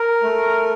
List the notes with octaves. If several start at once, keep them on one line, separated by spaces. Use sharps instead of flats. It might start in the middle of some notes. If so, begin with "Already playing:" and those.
Already playing: A#4
A3